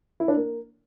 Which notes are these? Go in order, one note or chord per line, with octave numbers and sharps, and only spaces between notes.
E4
D4
A#3